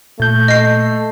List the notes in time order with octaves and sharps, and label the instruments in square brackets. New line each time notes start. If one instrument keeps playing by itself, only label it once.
[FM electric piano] A#2 G6 [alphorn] A3
[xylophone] D#5 C7